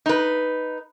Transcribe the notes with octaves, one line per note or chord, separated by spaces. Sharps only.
D#4 B4